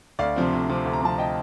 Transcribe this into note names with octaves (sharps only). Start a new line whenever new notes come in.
D2 D5 F5
C3 F3 C4
D2
C3 F3 C4
D2
A#5
C3 F3 C4 A5
D#5 G5